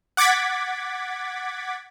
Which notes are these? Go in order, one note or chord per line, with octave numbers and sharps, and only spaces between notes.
F#5 D6 G#6 A6 B6